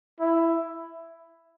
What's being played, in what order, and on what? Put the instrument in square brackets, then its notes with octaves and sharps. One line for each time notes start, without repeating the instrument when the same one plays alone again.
[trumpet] E4